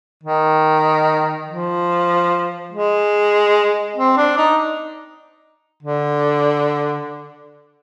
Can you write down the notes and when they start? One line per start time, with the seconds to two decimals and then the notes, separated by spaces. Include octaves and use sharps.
0.24 D#3
1.48 F3
2.72 G#3
3.97 C4
4.17 D4
4.37 D#4
5.83 D3